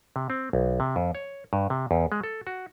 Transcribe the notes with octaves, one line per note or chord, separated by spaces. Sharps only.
C3
C4
B1
C3
F2
C#5
G2
C3
E2
G#3
A4
F#4